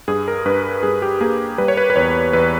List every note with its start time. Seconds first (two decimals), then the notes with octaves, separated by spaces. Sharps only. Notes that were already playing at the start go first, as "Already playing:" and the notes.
0.08 G2 G#4
0.28 A#4
0.46 G2 B4
0.83 G2 G#4
1.02 G4
1.21 A#3 G#4
1.58 G3 B4
1.68 C#5
1.77 B4
1.90 B4
1.96 E2 C#5
2.33 E2 B4